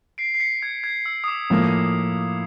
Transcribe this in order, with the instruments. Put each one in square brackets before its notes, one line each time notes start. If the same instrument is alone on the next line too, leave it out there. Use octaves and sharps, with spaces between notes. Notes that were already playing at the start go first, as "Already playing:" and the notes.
[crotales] C7 D7
C7
B6 C#7
G#6
G#6
E6
D#6
D6
[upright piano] A2 F3 A#3